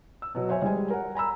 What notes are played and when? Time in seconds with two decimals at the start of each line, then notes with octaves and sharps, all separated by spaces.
0.22 E6
0.35 B2 F#3
0.49 C5 C#5 E5 G#5
0.62 G3 G#3 G#5
0.90 A#4 F#5
1.15 G#5 A#5 B5 E6